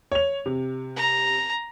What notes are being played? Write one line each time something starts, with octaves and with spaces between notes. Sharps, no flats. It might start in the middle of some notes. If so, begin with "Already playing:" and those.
C#5 F7
C3
A#5